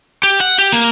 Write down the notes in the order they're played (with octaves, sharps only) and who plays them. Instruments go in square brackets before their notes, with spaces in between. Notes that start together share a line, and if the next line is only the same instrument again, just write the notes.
[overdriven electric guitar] G4
F#5
G4
A#3